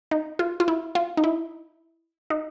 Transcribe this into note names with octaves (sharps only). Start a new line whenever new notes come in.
D#4
F4
F4
E4
F4
D#4
E4
D#4